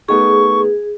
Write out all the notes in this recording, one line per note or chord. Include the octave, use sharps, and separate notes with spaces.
A3 B3 D#4 G#4 C#6